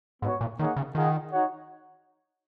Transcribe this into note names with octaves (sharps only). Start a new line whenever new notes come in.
G#2 B3 F#4 C#5
A#2
D#3 A#3 D#4 G#4 C#5 F#5
C#3
D#3 F4 G#4 D#5 F#5
D#4 F#4 C#5 F#5